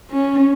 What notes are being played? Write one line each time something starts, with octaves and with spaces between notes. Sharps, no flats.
C#4